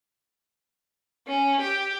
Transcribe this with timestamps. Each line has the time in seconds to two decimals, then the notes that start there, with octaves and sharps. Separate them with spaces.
1.28 C#4
1.61 G4